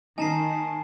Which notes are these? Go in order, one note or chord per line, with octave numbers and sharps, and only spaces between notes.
D#3 D#4 G#5 A5 C7